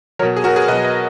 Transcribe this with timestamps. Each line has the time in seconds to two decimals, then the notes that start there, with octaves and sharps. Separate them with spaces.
0.19 F#3 A#4 C#5
0.22 B2
0.37 G#4
0.44 F#4 A#4
0.56 G#4 B4
0.68 B2 B4 D#5
0.73 F#3
0.84 B4 D#5